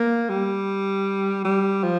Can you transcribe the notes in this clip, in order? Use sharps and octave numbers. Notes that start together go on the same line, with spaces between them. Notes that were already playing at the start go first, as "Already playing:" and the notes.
Already playing: A#3
G3
G3
F3